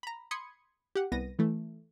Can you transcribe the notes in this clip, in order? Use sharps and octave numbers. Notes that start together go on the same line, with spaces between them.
A#5 B5
B5 C6 D#6 G#6 C#7
G4 F#5
C2 B3 A#6 D#7
E3 A3